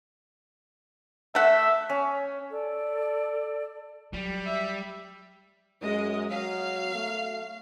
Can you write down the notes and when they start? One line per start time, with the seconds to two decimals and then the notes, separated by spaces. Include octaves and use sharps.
1.35 A3 E5 F#5
1.90 C#4
2.50 A4 D5
4.13 F#3 G3
4.46 E5
5.82 F#2 G#3 D#5
6.31 F#3 F5
6.95 A3